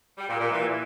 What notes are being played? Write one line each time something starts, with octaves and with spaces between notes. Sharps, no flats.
G3
A#2
A#2
E3